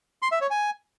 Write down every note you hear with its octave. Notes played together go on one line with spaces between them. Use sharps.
C6
E5
C#5
G#5